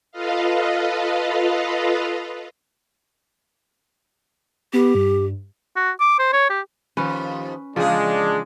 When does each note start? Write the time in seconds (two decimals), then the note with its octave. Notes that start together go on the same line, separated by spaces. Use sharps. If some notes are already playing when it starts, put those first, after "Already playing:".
0.12 F4 A4 B4 D#5 F5
4.73 B3 G4
4.95 G2
5.76 F#4
6.00 D6
6.19 C5
6.33 C#5
6.50 G4
6.97 D#2 F3 C#4 B4
7.76 E2 C#3 F3 G#3 D4 G#4